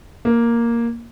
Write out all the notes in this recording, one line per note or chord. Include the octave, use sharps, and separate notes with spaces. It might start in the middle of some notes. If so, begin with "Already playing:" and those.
A#3